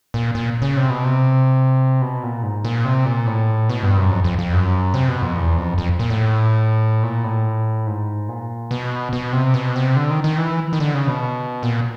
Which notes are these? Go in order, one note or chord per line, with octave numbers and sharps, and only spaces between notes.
A#2
A#2
C#3
C3
B2
C3
B2
A#2
G#2
A#2
C3
A#2
A2
B2
G2
F#2
F2
F2
F2
F#2
C3
B2
F2
E2
F2
F2
A#2
A2
A#2
A2
G#2
A#2
B2
B2
C3
B2
C3
D3
D#3
D#3
E3
D#3
D3
C#3
B2
A#2